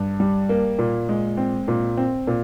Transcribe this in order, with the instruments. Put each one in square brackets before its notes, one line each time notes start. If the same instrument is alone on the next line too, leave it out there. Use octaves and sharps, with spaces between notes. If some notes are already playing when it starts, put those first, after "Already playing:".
Already playing: [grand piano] G2
G3
A#3
A#2
G#3
C4
A#2
C4
A#2